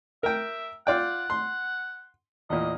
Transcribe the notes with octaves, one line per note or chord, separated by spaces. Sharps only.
A#4 E5 G5
F4 D5 F#5 G5
C6
E2 A#2 D#5